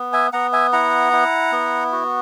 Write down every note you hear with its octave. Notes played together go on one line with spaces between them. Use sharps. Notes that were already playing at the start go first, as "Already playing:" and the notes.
Already playing: B3
E5 G#5
B3 F#5 A#5
E5 G#5
E4 F#5 A#5
E4
B3
F#4